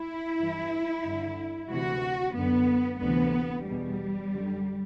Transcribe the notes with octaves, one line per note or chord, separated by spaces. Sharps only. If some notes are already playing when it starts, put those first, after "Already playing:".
Already playing: E4
G2 E3
G2 D3
D2 C3 E3 F#4
F#2 D3 B3
D2 C3 E3 B3
E2 B2 G3
F#2 D3